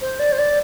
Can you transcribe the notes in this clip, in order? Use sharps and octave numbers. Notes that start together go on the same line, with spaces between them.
C5
D5
C5
D5